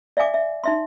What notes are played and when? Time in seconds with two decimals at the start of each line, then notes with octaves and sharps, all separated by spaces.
0.17 D5 E5 F5 G#5 D6
0.34 E5
0.64 D#4 E5 C6